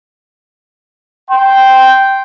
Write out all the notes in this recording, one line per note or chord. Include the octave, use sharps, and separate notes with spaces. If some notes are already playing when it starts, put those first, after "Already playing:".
G5 C6